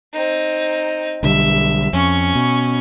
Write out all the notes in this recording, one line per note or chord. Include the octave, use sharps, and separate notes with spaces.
C4 D#4
B1 D3 G3 E5
F2 C#4 C#6
B2